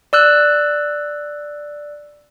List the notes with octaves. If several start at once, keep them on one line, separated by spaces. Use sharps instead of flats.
D5 E6 F#6